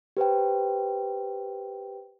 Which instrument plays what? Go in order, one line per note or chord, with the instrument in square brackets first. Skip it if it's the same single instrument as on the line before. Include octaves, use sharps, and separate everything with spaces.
[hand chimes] G4 B4 C5 G5